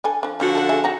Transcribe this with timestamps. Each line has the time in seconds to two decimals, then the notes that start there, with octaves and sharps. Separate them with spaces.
0.04 D4 A4 G#5
0.23 F3 D4
0.40 D3 F3 C#4 F4 F#4
0.55 A4 F#5
0.69 G#4 E5
0.84 D#4 F#4 A#5